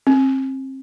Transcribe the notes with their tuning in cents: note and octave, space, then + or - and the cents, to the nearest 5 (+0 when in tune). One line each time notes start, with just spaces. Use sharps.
C4 +30